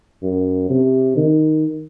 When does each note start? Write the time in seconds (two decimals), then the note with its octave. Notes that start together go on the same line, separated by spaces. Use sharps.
0.23 F#2
0.70 C3
1.17 D#3